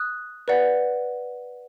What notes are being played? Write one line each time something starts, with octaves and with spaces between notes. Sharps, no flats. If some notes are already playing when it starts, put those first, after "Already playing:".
Already playing: D#6 F#6
B4 D5 F#5